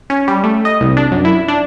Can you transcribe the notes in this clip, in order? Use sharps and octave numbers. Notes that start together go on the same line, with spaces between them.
C#4
G3
A3
D#5
C2
D4
F#2
E4
D4